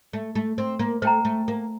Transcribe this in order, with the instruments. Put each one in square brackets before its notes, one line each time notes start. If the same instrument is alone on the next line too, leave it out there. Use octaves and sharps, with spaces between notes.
[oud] A3
A3
C4
A#3
[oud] A3 [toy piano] C5 G5 A#5
[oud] A3
A#3